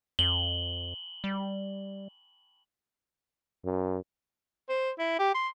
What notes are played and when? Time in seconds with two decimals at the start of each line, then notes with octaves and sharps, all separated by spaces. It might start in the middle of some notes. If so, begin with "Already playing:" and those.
0.19 F2 F#7 G7
1.24 G3
3.65 F#2
4.69 C5
4.99 E4
5.19 G4
5.34 C6